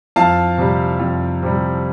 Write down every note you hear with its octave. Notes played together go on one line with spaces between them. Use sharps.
F2 F5 A5
C3 G3
F2
C3 G3